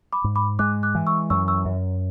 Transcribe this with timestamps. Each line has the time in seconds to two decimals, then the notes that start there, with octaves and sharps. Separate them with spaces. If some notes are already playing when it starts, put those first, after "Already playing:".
0.13 B5 D6
0.24 G#2
0.36 B5 D6
0.59 G#3 D6 F#6
0.83 D6 F#6
0.95 E3
1.07 C#6 E6
1.30 F#2 C#6 E6
1.48 C#6 E6
1.65 F#2